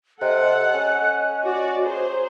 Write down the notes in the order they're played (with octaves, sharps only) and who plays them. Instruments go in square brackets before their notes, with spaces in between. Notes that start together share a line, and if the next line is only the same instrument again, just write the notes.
[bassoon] C3 [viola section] A4 F#5 [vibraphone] D#5 [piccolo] F#6
[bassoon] C#4
[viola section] F#4 D5 [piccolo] D6
[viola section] G#4 C5 [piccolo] A#5